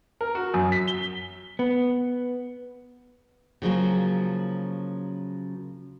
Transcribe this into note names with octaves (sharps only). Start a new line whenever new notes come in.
A#4
F#4
F#2
B6
G7
B3
C#3 F3 F#3 A#3